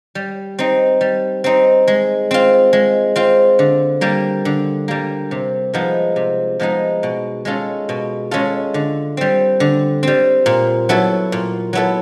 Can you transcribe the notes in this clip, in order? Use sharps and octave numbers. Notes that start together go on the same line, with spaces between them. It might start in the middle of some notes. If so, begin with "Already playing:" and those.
G3
C4 D#4
G3
C4 D#4
G#3
C4 F4
G#3
C4 F4
D3
G3 A#3
D3
G3 A#3
C3
F3 G#3 B3 D#4
C3
F3 G#3 B3 D#4
B2
G#3 C#4 F4 A4
B2
G#3 C#4 F4 A4
D3
G3 C4
D3
G3 C4
A#2
F#3 B3 E4 A4
A#2
F#3 B3 E4 A4